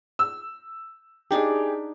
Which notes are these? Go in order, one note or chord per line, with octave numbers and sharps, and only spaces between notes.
E6
D4 D#4 G4 G#4 D5